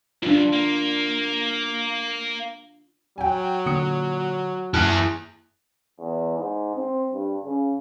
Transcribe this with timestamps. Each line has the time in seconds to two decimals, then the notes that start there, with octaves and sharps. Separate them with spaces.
0.22 D2 G2 D4 F4
0.53 A#3
3.18 F#3 G5 G#5
3.66 A#2 D3 D#6 C#7
4.74 F#2 A#3 E4 G#4 A5 F6 F#6
5.99 E2
6.39 G#2
6.76 C4
7.13 G2
7.45 C#3